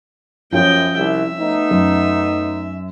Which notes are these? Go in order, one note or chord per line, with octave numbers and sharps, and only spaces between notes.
F#2 F3 C#4 F4 D#5 G5
C2 E5
A3 B3 D#4
F#2